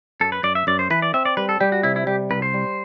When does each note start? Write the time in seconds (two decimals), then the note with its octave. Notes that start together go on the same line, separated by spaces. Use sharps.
0.20 F#2 A4
0.32 B4
0.43 F#2 D5
0.55 E5
0.67 F#2 D5
0.79 C5
0.90 E3 B4
1.02 D5
1.14 C4 E5
1.25 D5
1.37 G3 B4
1.49 A4
1.60 G3 G4
1.72 F#4
1.83 C3 E4
1.96 E4
2.07 G3 G4
2.31 C2 B4
2.42 C5
2.54 G3